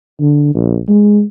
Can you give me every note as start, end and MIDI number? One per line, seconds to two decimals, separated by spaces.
0.20 0.52 50
0.54 0.79 34
0.88 1.22 56